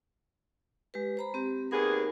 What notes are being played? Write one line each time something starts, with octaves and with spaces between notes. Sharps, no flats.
G#3 G4 B4
C5 A#5 B5
C4 G4
D#2 B3 D#4 G#4 A#4